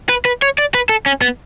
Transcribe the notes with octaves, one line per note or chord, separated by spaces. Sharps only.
B4
B4
C#5
D5
B4
A4
C#4
B3